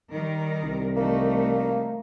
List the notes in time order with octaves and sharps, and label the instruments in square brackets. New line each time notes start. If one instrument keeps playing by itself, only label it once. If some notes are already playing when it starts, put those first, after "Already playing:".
[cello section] D#3 G3 A#4
[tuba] C2
[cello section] E3 A3 D#4 [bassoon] A#3